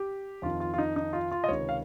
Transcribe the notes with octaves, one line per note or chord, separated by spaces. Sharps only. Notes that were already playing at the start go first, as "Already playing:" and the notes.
Already playing: G4
F2 D#3 F4
F4
F4
D#4
D#4
F4
F4
D#5
C#2 C3 D#3 C#5
F5